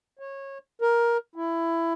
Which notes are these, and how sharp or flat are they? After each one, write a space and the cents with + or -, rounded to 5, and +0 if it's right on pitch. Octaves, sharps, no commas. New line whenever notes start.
C#5 -20
A#4 +10
E4 +15